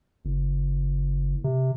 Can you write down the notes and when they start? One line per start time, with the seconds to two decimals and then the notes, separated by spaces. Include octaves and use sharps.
0.25 F#1
1.44 C3